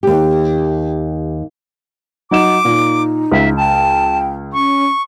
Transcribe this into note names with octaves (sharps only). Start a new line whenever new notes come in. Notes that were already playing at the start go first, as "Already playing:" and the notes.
D#2 G4
F#3 D#4 D6 E7
A#2 D#4
C#2 E5
G5 A5
C#4 C#6